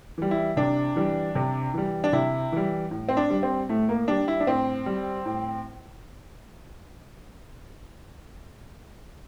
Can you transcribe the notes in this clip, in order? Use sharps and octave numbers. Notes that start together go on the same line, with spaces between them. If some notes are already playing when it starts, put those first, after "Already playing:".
E3 G3
E4
C3 D4
E3 G3
C3
E3 G3
D4
C3 E4
E3 G3
A2
C4
D4
G3
C4
A2 A3
A#3
G3 D4
E4
D4
A2 C4
G3
A2